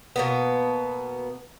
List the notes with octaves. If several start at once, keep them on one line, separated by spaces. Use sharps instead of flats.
B2 A#3 B3